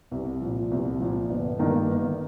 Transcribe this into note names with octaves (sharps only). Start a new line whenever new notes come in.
C2
A#2 F3
C2
A#2 F3
G1
G2 D#3 A#3
G1